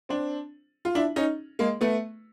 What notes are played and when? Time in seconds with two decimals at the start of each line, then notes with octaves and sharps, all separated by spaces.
0.09 C4 D4
0.85 F4
0.95 D4 E4
1.16 C#4 D#4
1.59 G#3 A#3
1.81 A3 B3